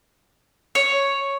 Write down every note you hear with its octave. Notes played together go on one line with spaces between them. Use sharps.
C#5